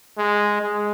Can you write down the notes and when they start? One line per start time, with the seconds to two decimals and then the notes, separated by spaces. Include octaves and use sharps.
0.18 G#3
0.62 G#3